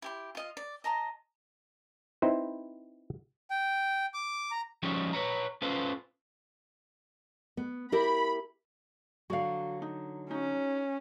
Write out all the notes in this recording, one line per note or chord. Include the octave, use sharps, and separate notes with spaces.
E4 G4 C6
F4 D#5 F5
D5
D#5 A5 A#5 C6
C4 D#4 E4 B4 C5
G5
D6
A#5
F3 G3 G#3 C4 C#4 D#4
B4 C#5 A#5
C#4 F4 A4 B4 C5
B3
E4 G4 A#4 B5
D3 F#3 F#4 D5 F5
D#4
C#4 D#4 F#4